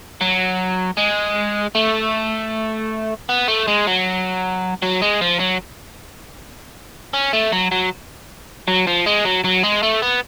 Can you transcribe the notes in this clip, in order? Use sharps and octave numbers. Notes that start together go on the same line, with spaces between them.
F#3
G#3
A3
B3
A3
G#3
F#3
F#3
G#3
F3
F#3
C#4
A3
F#3
F#3
F#3
F3
G#3
F#3
F#3
G#3
A3
B3